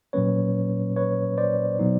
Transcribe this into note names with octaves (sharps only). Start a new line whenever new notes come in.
A#2 F#3 A#3 C#4 B4 C#5
B4 C#5
C5 D5
B2 F#3 B3 D#4